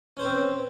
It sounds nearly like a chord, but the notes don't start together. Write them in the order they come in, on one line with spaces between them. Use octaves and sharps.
C#4 C5 B4 C4